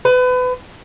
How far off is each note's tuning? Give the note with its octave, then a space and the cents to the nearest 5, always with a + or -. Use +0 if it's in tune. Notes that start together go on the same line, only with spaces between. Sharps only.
B4 +30